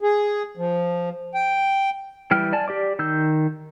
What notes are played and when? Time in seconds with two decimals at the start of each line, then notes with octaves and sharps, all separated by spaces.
0.02 G#4
0.57 F3
1.35 G5
2.31 E3 G3 G5 F6
2.53 D5 G#5 A5
2.68 G4 D5 D6
2.99 D#3 E6 G6